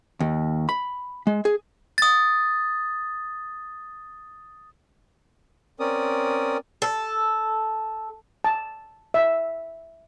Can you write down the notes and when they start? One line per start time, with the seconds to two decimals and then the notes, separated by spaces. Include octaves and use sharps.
0.20 D#2
0.69 B5
1.27 G#3
1.45 G#4
1.98 D#6 A6
5.80 C4 C#4 A#4 D5 D#6
6.82 A4
8.44 A5
9.14 E5